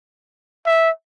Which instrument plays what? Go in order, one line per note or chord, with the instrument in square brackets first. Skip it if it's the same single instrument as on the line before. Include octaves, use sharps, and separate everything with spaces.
[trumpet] E5